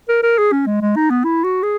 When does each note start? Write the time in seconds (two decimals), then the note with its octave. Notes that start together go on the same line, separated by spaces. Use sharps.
0.09 A#4
0.23 A#4
0.38 G#4
0.52 C#4
0.67 G#3
0.82 G#3
0.96 D#4
1.10 B3
1.24 E4
1.44 F#4
1.63 G#4